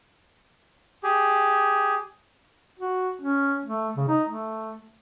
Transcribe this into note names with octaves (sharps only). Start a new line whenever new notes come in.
G4 G#4
F#4
C#4
A3
C#3
D#4
A3